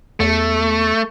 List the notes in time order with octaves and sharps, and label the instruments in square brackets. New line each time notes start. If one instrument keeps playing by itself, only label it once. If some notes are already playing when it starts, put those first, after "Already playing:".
[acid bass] E2 [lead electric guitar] A3